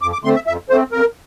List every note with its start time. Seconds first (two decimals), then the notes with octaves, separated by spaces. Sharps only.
0.02 F2 D6
0.13 D6
0.24 D3 A3 C4 C6
0.35 E5
0.46 F2 E5
0.69 D3 A3 C4 C5
0.91 F2 A#4